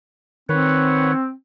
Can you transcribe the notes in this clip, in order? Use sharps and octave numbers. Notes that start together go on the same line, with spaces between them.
D#3 C4 B4 C#5 F#5